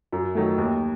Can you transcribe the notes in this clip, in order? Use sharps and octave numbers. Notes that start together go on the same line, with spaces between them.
F#2
D#3 F#3 A3
D#2